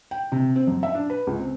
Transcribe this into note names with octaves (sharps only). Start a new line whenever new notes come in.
G5
C3
C4
F#2
E5
D4
B4
C#2
C4